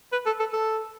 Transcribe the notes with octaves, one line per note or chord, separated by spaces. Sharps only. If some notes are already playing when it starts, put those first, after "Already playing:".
B4
A4
A4
A4